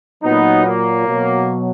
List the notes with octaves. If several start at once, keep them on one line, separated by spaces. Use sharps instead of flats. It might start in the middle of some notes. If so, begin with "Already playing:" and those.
A#2 F#3 B3 D#4
A#3
B2 F#3